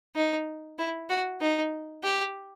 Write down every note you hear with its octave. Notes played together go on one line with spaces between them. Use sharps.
D#4
E4
F#4
D#4
G4